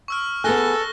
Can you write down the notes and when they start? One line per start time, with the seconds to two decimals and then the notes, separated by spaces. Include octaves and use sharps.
0.08 C#6 E6 F6
0.44 B3 G#4 A4 G#5 F#6 A#6 G7